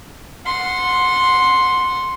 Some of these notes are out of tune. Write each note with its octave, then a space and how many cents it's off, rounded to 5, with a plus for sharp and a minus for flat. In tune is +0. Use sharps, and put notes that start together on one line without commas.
F#5 -15 C6 +0